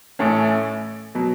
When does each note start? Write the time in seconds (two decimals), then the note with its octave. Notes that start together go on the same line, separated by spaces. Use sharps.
0.19 A1 A2 A3 C#4
1.15 B2 F#3